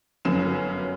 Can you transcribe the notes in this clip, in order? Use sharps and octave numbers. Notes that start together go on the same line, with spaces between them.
G1 F#2 C#4 E7